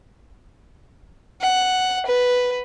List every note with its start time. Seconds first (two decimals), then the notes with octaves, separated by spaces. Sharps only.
1.41 F#5
2.06 B4